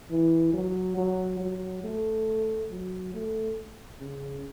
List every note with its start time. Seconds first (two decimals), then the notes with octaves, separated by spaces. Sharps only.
0.11 E3
0.54 F#3
0.97 F#3
1.41 F#3
1.84 A3
2.71 F#3
3.14 A3
4.01 C#3